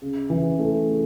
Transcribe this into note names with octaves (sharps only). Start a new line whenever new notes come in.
C#3
E3
A3
C#3